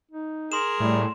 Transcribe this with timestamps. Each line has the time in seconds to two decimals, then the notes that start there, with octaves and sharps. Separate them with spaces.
0.11 D#4
0.52 G#4 A#4 C6 E7
0.80 A2 G3